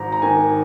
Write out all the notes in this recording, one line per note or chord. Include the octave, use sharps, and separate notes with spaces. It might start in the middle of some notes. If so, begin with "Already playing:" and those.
Already playing: G#1 G#2 A#5
A#5
D#3 G#5